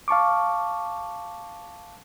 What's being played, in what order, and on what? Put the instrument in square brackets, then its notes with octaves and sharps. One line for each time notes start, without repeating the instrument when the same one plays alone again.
[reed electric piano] F5 A5 C#6 D6